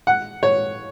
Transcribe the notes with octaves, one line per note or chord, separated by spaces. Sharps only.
F#5
C#5